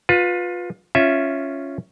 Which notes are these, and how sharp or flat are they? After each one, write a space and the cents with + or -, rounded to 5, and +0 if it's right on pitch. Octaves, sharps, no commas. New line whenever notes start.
F4 +25 B4 +0
C#4 +0 F4 +0 E5 +0